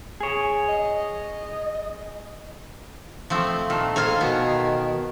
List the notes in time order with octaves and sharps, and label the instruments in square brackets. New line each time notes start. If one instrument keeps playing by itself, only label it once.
[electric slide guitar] G#4 C#5
[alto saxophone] D#5
[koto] F3 A3 C4
[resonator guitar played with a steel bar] A#2 A5 [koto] D#3
[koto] D#3 G#5 A#5 [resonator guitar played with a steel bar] A4 C5 F5
[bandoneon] B2 D#3 [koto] B3